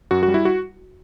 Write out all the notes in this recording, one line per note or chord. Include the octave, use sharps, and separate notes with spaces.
F#2 F#4
F#4
G3
E4
F#4